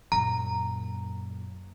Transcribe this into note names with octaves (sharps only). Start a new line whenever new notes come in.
F#2 A#2 A#5